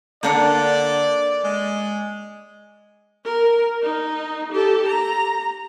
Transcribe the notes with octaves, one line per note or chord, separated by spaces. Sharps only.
D3 A#3 D4 D5 F#5
G#3
A#4
D#4
G4 A4
A#5